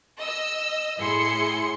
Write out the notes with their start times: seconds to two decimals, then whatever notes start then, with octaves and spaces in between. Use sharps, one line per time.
0.21 D#5 E6
1.00 A2 E4 G#4 C6 C#7